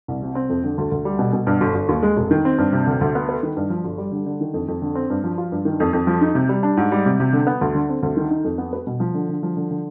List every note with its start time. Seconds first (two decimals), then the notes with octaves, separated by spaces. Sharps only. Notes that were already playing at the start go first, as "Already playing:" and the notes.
0.08 C2
0.22 C3
0.35 C4
0.49 F2
0.64 D3
0.78 D2
0.92 D2
1.05 G3
1.19 B2
1.33 B2
1.47 G2
1.61 G1
1.75 G1
1.89 D#2
2.03 G#3
2.17 F1
2.31 D#3
2.45 C4
2.58 G2
2.73 C3
2.87 D2
3.01 D2
3.15 B3
3.29 B4
3.43 D#3
3.57 G2
3.70 F3
3.84 G1
3.98 G3
4.12 D3
4.26 D3
4.41 D#3
4.54 F2
4.68 F2
4.82 D3
4.95 C4
5.10 G2
5.24 F3
5.38 F4
5.52 G2
5.65 D#3
5.80 F2
5.93 F2
6.07 F3
6.21 D#4
6.35 C3
6.49 G3
6.63 D4
6.77 G#2
6.92 G3
7.06 C3
7.20 C3
7.33 D3
7.47 B3
7.61 D2
7.75 D3
7.89 C4
8.03 D2
8.17 D#3
8.31 D#4
8.44 F2
8.58 B3
8.73 B4
8.87 B2
9.00 F3
9.14 D3
9.29 D3
9.43 F3
9.57 D3
9.71 D3